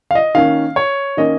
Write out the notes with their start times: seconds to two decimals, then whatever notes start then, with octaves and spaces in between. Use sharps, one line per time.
0.11 F5
0.15 D#5
0.35 D#3 A#3 C#4 F5
0.76 C#5
1.17 D#3 A#3 C#4 D#5